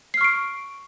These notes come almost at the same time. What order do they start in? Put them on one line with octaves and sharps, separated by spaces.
C7 F6 C#6 D7